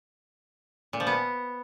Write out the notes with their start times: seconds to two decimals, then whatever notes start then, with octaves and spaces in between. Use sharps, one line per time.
0.93 A#2
1.00 F3
1.07 B3